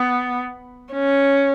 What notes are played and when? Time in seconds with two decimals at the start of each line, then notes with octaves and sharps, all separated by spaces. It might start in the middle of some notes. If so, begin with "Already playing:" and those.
Already playing: B3
0.93 C#4